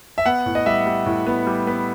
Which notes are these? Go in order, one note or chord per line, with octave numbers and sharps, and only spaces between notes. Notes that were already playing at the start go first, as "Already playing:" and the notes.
E5
B3 F#5
A2
D#5
G3 E5
G3
A2
B3
G3
B3